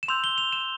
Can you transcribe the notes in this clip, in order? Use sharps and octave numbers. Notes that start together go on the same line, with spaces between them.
E7
C6 E6 G6 F7
G7
F7
E7